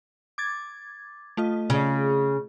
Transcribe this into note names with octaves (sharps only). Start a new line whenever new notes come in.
D6 G#6 A6
A3 F4 D#5
C#3